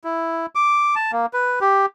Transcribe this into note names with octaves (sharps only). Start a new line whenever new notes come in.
E4
D6
A5
A#3
B4
G4